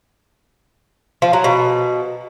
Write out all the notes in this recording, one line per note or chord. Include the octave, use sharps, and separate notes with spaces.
F3
F#3
B2